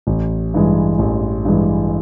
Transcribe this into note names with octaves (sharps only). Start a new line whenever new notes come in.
A1
G2 E3 G#3
A1
G2 E3 G#3